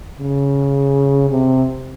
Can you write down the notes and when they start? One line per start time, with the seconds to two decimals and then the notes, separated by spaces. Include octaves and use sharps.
0.18 C#3
1.30 C3